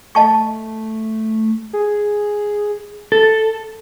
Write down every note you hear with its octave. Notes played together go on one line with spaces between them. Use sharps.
A3 D#5 A5 C#6
G#4
A4